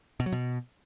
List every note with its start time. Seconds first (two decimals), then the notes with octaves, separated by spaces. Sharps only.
0.20 B2
0.26 F#3
0.32 B2